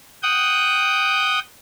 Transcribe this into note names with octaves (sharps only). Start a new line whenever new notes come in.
F#5 G5 D#6 G6